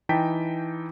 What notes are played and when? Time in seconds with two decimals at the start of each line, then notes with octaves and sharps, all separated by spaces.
0.09 E3 D#4 G5 A5 B6